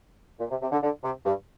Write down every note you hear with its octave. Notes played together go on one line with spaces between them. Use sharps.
A#2
C3
C3
D3
D3
C3
G2